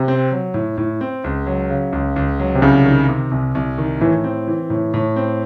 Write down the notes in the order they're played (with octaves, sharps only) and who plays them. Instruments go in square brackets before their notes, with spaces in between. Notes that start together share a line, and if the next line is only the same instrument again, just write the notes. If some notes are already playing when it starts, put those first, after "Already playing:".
Already playing: [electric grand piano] C3
[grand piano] C4
F#3
A2
A2
C4
C#2
F#3
C#3
C#2
C#2
F#3
[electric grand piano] C3
[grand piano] C2 [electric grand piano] C#3
[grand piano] D#3
C3
C2
C2
D#3
[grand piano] A2 [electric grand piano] E3
[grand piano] C4
E3
A2
A2
C4